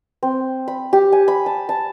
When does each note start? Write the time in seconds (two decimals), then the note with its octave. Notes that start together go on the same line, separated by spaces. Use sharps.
0.23 C4
0.68 B5
0.93 G4
1.12 G#5
1.28 B5
1.46 A5
1.69 A5